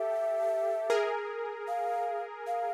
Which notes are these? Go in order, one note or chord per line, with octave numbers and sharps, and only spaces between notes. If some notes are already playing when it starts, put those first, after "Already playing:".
Already playing: G4 A4 E5
G#4 A#4
F5
F5